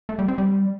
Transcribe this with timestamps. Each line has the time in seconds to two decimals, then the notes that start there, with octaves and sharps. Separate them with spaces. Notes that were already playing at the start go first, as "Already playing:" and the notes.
0.09 A3
0.19 G3
0.28 C4
0.38 G3